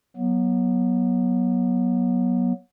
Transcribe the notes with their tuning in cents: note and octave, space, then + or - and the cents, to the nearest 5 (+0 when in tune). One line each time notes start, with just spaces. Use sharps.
F#3 +0 B3 -30